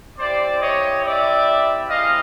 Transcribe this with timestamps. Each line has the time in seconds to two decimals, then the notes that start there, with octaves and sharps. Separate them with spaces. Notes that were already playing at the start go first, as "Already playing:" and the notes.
0.18 C4 E4 G4 C5 D5
0.61 C#5 D#5
1.04 D5 E5
1.89 G#3 C4 E4 D#5 F5